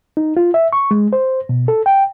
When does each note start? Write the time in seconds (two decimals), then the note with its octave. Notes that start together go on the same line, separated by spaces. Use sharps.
0.17 D#4
0.37 F4
0.54 E5
0.73 C#6
0.91 G#3
1.13 C5
1.49 B2
1.68 A4
1.86 G5